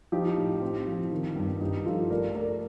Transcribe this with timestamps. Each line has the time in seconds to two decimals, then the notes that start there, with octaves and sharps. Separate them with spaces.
0.12 F3 D#4 G4
0.37 A2
0.62 C4
0.87 F3
1.12 D#3
1.36 G2
1.61 G2 D#4 G4
1.85 F3 F4 A4
2.10 A3 A#4 D5
2.35 A3 A#4 D5